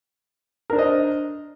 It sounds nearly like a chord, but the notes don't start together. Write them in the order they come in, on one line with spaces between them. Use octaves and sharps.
A#4 D4 C5 D#5